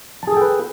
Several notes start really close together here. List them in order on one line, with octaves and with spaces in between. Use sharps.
A5 G#4 A4 G5 B4